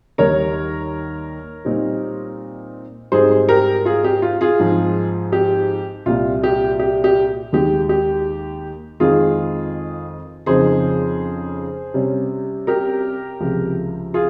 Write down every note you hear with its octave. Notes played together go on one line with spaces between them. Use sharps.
D#2 D#3 G3 A#4 C#5
A#2 G3 C4 D#4
G#2 G3 C4 D#4 G#4 C5
G4 A#4
F4 G#4
G4
F4
F4 G#4
G#2 F3 C4
G4
C2 A#2 G3 F4
G4
G4
G4
D#2 D#3 G#3 G4
G4
F2 D#3 G#3 C4 F4 G#4
F2 C#3 F3 C4 D#4 G#4 C5
C3 G3 C#4
G4 A#4
C#2 C3 F3
F4 G#4